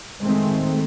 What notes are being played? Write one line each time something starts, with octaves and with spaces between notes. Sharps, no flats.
D#3 G#3 A3 C4